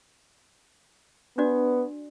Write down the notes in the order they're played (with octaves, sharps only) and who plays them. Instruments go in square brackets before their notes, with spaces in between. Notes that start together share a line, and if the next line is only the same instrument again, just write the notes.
[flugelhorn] B3 [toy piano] D4 F#4 D5